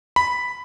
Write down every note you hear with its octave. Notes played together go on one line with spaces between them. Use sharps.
B5